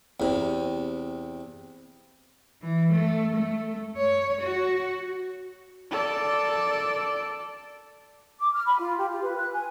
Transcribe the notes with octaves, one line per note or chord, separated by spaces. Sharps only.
E2 C3
E3
A3
A3
C#5
F#4
A4 D5
D6
F6
B5
F4
G4
F4
B4
F#6
G#5